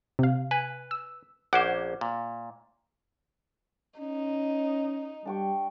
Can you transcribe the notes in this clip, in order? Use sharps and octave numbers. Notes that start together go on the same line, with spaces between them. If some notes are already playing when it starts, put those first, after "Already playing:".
C3 F5
B4 G#5
E6
A#1 C#4 C5 F#5 D6
A#2
C#4 D#4
G3 D4 G5 C#6